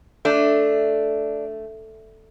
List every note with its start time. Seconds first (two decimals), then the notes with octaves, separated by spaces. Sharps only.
0.25 A3 D4